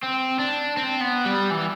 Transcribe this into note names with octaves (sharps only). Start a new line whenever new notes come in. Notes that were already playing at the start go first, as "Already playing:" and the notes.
C4
D4
C4
B3
G3
E3